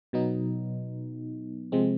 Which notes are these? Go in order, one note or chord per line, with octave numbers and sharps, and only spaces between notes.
B2 F#3 B3 D#4
C3 F3 G#3 C4